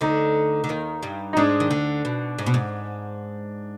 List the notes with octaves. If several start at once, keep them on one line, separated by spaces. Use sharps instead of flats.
D2 D3 D#4
D3
D#2 D#3
G2 G3
D#4
G#2 G#3 D4
D#3
D2 D3
B2
G#2
B2
G#2